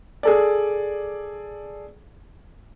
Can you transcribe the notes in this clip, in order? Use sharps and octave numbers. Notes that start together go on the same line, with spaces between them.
G#4 A4 D5